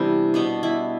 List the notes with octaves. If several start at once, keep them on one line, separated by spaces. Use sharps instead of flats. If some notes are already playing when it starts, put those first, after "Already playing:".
Already playing: C3 E3 G3 B3 D4 E4 G4
B2 B3 D4
E4